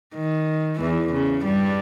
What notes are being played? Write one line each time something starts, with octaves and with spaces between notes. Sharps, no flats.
D#3
E2 E3
C#3
G2 G3